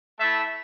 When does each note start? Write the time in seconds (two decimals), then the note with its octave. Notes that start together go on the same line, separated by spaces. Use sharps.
0.19 A3 E4 E5 A5